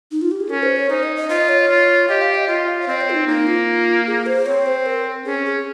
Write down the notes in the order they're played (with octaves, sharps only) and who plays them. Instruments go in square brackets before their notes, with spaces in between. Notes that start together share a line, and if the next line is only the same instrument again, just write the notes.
[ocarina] D#4
F4
G4
G#4
[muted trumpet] C#4 [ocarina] A#4
[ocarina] C5
C#5
[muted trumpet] D#4 [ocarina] C5
[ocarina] D#5
D#5
[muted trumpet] F4 [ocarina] D#5
[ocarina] C#5
[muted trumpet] F4
[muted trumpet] G4 [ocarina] D#5
[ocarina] F5
D#5
[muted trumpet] F4 [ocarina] D#5
[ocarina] F5
C#5
[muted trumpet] C4 [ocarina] D#5
[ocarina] C#5
F4
D#4
[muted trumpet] A#3 [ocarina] D#4
[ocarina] F4
G#4
C5
[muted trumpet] C4 [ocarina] C#5
[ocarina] C5
A#4
[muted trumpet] C#4 [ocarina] G#4
[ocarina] G#4